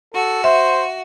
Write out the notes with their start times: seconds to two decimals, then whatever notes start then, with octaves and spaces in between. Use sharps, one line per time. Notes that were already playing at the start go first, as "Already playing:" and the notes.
0.14 F#4 A4
0.44 C5 E5